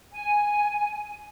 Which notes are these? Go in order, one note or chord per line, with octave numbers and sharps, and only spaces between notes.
G#5